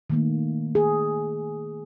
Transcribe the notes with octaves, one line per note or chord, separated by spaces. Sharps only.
D#3 A3 A#3
G#4